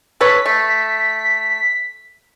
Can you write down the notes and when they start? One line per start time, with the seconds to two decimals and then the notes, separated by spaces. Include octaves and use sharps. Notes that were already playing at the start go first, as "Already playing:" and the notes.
0.21 A4 B4 C#5 B6
0.46 A3